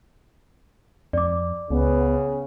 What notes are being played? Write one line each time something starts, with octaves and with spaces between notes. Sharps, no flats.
F2 D5 D6
C#2 C#3 B3